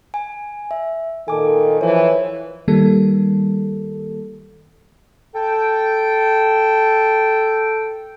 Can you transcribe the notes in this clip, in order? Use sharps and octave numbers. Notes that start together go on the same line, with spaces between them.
G#5
E5
A#2 D#3 A4 G#5 D6
E3 F3 C5 C#5
D#3 G3 A#3 A4
A4 G5